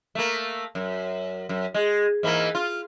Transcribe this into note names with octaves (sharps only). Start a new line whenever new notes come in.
A3 A#3
F#2
F#2
G#3
G#2 E3 A#3
F4